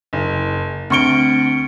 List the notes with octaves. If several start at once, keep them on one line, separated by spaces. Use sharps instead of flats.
F#1
D2 C4 C#6 C#7 D7 G7